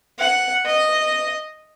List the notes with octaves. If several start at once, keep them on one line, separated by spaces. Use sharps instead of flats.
F#5
D#5